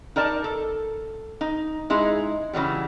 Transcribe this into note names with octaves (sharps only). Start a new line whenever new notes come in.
D#4 A#4 D5 A5
A4
D#4
G#3 D#4 E4 G#4
C#3 E3 F#3 G3